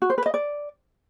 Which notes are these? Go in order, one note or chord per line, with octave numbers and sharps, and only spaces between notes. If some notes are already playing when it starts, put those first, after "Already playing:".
F#4
C5
B4
D#5
D5